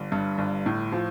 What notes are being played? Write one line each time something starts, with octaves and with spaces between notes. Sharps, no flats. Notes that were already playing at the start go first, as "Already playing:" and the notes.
Already playing: G1
G2
G1
A2
F3